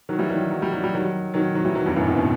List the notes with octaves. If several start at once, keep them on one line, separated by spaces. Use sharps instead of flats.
D#3 F#3
E3 G3
D#3 F#3
F#3
G3
F#3
G3
D#3 F#3
D#3 F#3
D#3 F#3
E3 G3
D#3 F#3
E2 G2
F#2 A2
A2 C3
B2 D#3